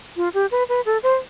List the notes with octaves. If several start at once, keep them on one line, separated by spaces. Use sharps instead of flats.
F4
G4
B4
B4
A4
C5